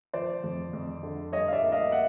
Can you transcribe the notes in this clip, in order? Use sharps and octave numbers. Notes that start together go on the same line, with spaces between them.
F3 C5 D5
F2
F2
D3
G3 C#5 D#5
F5
D5 E5
A#3
D#5 F5
E5 F#5